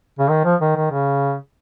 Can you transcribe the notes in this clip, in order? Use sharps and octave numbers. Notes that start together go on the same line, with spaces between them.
C#3
D#3
F3
D#3
D#3
C#3